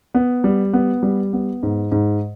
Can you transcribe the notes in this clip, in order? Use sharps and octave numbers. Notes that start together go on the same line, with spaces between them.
B3
G3
B3
G3
B3
G#2
G#2